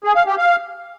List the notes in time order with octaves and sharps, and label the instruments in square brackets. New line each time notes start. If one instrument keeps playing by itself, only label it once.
[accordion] G#4
F5
G4
F5